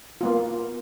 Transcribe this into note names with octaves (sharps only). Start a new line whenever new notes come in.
A#3 B3 F4